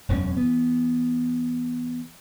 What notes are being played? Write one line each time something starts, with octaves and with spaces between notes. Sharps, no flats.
E1 F#2 F3 C#4
E3 B3